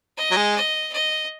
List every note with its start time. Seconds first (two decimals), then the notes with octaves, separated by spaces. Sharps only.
0.17 D#5
0.31 F#3
0.37 G#3
0.56 D#5
0.93 D#5